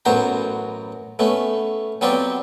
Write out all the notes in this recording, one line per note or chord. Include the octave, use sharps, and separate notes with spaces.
A1 F#2 F#3 B3 C5 A#5
A3 B3 C#4
F#3 B3 C4 F4 G4 D5